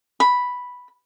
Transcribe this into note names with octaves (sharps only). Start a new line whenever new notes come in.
B5